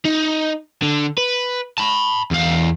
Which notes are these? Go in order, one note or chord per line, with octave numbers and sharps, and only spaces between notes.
D#4
D3
B4
A5 B5
E2 F5